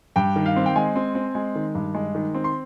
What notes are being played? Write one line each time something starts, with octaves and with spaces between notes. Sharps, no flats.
G2 G5
D#3
F5
C4
G5
G#3 G#5
C4
C4
G#3
D#3
G2
G#3
D#3
C4
C6